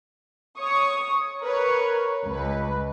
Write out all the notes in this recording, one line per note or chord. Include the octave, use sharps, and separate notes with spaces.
C#5 C#6 D#6
A#4 B4 C#5
C#2 B4